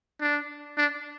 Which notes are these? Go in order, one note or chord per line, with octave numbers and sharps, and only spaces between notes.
D4
D4